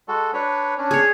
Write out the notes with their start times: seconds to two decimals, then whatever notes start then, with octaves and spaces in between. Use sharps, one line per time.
0.08 G#3 F#4 A4
0.33 D4 B4 C#5
0.78 C#4 D4
0.91 G#4 C#5